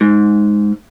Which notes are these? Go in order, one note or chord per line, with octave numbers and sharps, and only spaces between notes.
G#2